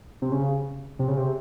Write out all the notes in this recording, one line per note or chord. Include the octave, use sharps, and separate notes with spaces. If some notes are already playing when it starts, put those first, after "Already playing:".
C3
C#3
C3
C#3
C3